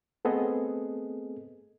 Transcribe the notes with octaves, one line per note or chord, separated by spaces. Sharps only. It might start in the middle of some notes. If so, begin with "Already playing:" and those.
A3 B3 C4 G#4 A4 D#5